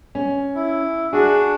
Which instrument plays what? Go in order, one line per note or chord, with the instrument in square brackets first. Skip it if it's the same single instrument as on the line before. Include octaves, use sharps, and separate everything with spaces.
[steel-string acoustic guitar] C#4
[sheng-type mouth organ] E4
[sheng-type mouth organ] D4 F#4 [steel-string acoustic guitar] G#4